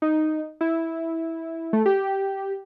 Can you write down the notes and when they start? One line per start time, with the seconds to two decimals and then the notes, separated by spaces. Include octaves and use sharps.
0.02 D#4
0.61 E4
1.73 A3
1.86 G4